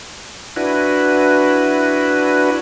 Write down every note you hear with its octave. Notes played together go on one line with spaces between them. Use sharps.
D4 E4 F#4 B4